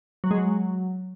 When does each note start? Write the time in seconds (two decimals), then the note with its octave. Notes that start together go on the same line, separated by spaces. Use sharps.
0.24 F#3
0.31 G#3
0.38 F#3